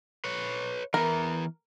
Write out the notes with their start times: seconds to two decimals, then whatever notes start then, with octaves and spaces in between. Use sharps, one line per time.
0.24 B4 C#5
0.94 E3 B3 A#4